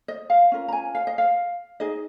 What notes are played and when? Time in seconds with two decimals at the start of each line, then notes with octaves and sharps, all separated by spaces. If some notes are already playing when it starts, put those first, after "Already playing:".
0.08 D#5
0.30 F5
0.52 C#4 F4 A#4
0.68 A#5
0.72 G#5
0.95 F5
1.07 D#5
1.18 F5
1.80 D#4 G#4 D#5